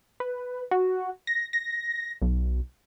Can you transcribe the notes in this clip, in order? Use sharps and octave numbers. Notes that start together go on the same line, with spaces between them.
B4
F#4
A#6
A#6
B1